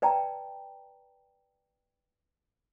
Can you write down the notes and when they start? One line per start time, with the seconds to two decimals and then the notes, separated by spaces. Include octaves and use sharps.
0.02 B4 D5 G5 A5 A#5